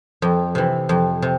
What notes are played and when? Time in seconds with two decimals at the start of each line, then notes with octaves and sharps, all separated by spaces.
0.22 F2
0.55 C3 E3
0.89 F2
1.22 C3